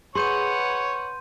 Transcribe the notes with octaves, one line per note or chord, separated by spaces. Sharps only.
G#4 B4 C#5 F#5 C6 G6 D#7